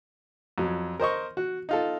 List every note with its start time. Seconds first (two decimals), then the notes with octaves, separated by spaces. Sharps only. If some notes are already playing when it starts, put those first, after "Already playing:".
0.58 F2 F#3
1.00 A#4 C5 D#5 C#6
1.37 F#4
1.69 D#4 F4 A4